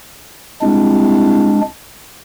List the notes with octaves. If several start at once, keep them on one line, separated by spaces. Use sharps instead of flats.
C2 G#3 D4